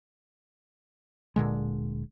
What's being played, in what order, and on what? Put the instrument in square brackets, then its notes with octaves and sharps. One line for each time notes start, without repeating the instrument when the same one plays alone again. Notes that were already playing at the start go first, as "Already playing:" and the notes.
[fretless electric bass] D1 A#2 D3 G#3